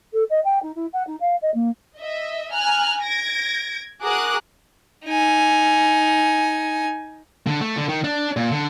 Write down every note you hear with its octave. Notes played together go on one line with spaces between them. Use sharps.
A4
D#5
G5
D#4
E4
F#5
D#4
F5
D#5
A#3
D#5 E5
G#5 A#5 F6 F#6
G#6 A#6 D7
F#4 G#4 A#4 D6 D#6 F#6
D#4 G#5
D3
A3
D3
D#3
D4
A#2
D3